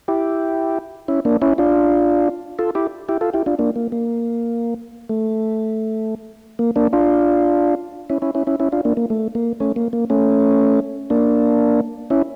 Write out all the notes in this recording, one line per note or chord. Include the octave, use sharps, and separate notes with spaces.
E4 G4
C#4 E4
A#3 D4
C#4 E4
D4 F4
F4 A4
E4 G4
E4 G4
F4 A4
E4 G4
D4 F4
A#3 D4
A#3
A#3
A3
A#3
A#3 D4
D4 F4
C#4 E4
C#4 E4
C#4 E4
C#4 E4
C#4 E4
D4 F4
A#3 D4
A#3
A3
A#3
A3 C#4
A#3
A#3
A3 C#4
A#3 D4
C#4 E4